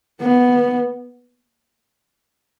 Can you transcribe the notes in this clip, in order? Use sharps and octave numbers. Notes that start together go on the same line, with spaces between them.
B3